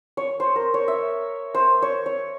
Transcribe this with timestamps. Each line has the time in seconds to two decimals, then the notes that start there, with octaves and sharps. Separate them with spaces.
0.17 C#5
0.40 C5
0.56 A#4
0.74 C#5
0.88 E5
1.54 C5
1.82 C#5
2.06 C#5